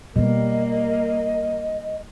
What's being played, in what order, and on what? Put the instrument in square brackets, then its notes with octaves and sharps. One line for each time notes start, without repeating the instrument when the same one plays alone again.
[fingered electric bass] B2 B3 [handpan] G3 [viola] A#3 [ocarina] D#5